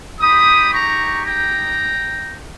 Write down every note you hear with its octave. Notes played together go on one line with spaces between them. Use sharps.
G#3 D#4 G4 B5 D#6
A#5 C#6
G5 A#5